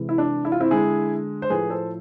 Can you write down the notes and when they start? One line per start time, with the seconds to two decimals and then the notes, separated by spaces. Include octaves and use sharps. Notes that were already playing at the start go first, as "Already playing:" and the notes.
Already playing: C3 E3 G#3
0.09 E4
0.18 D4
0.45 E4
0.52 F4
0.60 C4 E4
0.71 D3 G#3 E4 G#4
1.42 C5
1.50 A2 F3 A3 G#4 B4
1.70 A4 C5